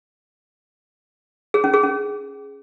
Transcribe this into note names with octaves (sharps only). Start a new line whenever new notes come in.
G#4
C#4
G#4
C#4